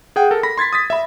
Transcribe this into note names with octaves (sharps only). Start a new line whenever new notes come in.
G#4 F#5 G5
A4 A#4
B5 A#6
C6 G#6 A6 B6
D#6 A6 B6
E5 B5